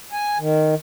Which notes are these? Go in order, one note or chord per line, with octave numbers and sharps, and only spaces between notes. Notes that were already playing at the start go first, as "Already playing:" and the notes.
G#5
D#3